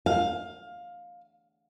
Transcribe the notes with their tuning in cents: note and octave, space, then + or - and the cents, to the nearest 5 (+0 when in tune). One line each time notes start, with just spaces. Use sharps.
F5 +15